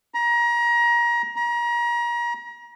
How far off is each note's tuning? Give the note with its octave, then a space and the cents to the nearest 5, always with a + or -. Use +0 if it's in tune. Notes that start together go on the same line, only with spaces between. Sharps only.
A#5 +30
A#5 +35